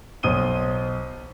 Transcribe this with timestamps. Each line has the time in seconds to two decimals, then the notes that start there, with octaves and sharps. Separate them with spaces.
0.23 B1 C5 D#6 D#7 G7